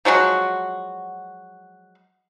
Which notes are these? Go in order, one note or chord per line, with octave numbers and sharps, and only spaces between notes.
F3 F#3 G#3 F#4